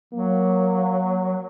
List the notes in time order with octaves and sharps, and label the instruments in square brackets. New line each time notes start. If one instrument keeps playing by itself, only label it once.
[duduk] F#3 [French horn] A#3